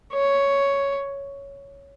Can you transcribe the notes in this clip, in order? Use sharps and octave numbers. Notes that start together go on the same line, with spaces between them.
C#5